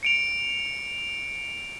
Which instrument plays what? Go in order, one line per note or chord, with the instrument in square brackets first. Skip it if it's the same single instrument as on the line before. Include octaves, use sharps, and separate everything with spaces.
[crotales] C#7 D7 F7